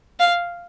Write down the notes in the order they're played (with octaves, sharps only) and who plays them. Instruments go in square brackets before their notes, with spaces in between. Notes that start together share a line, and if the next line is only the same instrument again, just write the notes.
[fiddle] F5